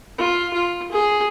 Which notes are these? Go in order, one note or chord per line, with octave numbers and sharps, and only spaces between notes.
F4
F4
G#4